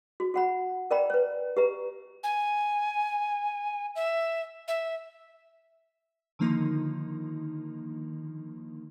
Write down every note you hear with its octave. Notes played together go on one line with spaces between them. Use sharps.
F#4
F#4 F#5 B5
A#4 D5 G5 A#5 B5
B4 C#5
G4 B4 A#5
G#5
E5
E5
D3 D#3 F3 A#3 D#4